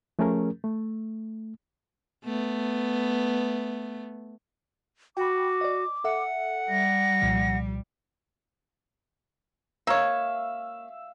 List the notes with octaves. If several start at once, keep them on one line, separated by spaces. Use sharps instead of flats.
F3 A3 C#4 G#4 A#4
A3
A3 B3
F#4 G5 B5 D6
D5 D#5
A4 E5 F#5
G3 A#6
C2 A#2 F3
A#3 C#5 E5 F5